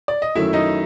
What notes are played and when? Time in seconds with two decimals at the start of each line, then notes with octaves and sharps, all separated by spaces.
0.08 D5
0.22 D#5
0.35 F#2 D#3 F#3 A3 E4 E5
0.53 D#4 D#5